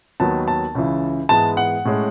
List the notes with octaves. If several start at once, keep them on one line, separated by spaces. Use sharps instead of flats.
D#2 D#3 F#3 B3 A5
A5
C#2 C#3 E3
G#2 E3 G#3 B3 A5
F#5
A2 G#3 C#4